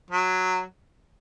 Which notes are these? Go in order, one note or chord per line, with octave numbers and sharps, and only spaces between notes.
F#3